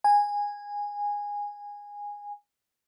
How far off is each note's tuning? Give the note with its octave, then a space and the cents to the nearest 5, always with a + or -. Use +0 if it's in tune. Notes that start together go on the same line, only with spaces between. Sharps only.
G#5 -15